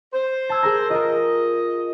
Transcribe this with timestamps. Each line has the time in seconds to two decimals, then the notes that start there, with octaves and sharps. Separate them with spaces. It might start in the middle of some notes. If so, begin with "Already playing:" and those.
0.13 C5
0.49 A5 E6 G#6
0.63 G#4 A#4 A#5
0.90 F4 A#4 D#5